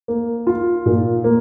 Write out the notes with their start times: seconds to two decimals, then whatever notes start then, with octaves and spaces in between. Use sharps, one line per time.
0.08 A#3
0.47 F4
0.86 A#2
1.24 A#3